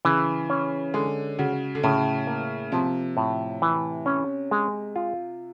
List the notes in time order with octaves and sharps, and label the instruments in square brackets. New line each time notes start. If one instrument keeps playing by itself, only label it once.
[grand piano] C#3 [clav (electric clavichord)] E3
[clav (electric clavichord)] C#4
[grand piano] D3 [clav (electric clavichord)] G#3
[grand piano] C#3 [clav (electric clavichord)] F#4
[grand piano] D3
[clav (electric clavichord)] A2 [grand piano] C#3
[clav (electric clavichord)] A#3
[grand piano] C3 [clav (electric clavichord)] F3
[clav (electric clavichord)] A2
E3
C#4
G#3
F4